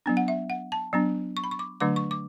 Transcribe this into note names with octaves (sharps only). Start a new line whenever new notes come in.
F#3 B3 D4
F#5
E5
F#5
A5
F#3 B3 D4
C#6
B5
C#6
D6
D3 F#3 A3 D4 D6
C#6
D6